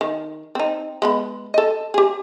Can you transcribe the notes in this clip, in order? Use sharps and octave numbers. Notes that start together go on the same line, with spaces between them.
D#3
C4 D#4
G#3 B3 B5
A4 D#5
G4 G#4